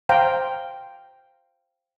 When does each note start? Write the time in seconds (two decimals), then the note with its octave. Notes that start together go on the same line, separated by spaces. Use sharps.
0.09 C5 F5 G5 A#5